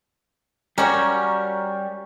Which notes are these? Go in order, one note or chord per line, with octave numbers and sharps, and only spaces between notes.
G3 C#4 F#4 A#4 D5